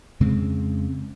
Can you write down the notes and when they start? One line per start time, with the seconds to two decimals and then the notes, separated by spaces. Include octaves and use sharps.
0.20 F2 C#3 G#3 C4